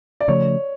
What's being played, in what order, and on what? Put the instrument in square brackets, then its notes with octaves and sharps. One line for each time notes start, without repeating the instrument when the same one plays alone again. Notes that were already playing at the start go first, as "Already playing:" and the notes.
[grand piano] D5
[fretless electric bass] C#3 F3 A3 [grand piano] C#5